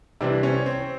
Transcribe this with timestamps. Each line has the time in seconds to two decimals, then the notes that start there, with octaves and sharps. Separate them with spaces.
0.21 C3 E3 G3 C4 D4
0.43 C#4
0.66 C4